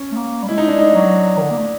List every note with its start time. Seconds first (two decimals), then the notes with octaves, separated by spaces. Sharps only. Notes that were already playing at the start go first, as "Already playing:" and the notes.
Already playing: C#4
0.12 A3
0.16 A#3
0.43 G3
0.48 G#3 E4
0.58 D#4
0.68 D4
0.79 D#4
0.95 F#3
1.37 D#3
1.42 D3
1.51 A#3
1.58 A3